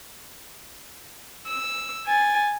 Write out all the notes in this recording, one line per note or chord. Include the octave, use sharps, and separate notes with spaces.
E6
G#5 A6